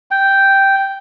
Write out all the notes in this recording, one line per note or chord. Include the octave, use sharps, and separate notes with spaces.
G5